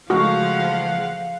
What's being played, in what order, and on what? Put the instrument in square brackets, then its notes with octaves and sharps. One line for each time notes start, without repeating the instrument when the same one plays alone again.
[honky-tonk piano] C#3 G#3 A3 [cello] F3 [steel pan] F#4 [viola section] F5 F#5